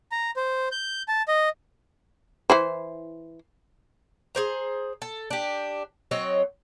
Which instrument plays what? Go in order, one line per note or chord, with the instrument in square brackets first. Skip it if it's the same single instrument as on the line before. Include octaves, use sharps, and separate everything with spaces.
[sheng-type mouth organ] A#5
C5
G6
A5
D#5
[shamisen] E3 E4 C5
[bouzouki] G#4 C5 A#5
A4
D4 G4
F#3 C4 C#5 D#5